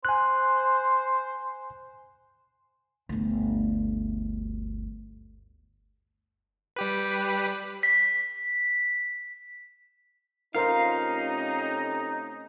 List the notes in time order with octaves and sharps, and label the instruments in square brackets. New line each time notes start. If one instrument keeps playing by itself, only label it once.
[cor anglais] C5 [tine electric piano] G#5 F#6
[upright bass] G1 D2
[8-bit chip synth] G3 G4 B4
[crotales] B6
[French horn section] C3 A3 C#4 [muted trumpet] D#4 [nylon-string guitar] F4 A#4 C5 [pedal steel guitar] F5